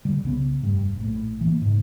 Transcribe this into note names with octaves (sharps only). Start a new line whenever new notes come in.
D3 G3
C2 C#3 B3
F1 G2
A#1 A2
E3 A#3
G#2 C#3